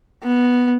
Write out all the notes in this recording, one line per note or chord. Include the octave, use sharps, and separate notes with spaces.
B3